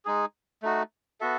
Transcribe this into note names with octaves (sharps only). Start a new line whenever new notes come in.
G#3 D#4 G#4
A3 D#4 F#4
B3 F#4 A4 E5